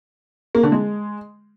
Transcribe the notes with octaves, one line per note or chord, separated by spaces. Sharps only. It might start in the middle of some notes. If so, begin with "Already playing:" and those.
A#3
D3
G#3